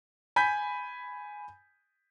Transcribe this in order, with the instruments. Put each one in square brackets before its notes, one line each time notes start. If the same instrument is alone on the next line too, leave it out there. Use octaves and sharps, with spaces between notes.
[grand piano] G#5 B5 G6 B6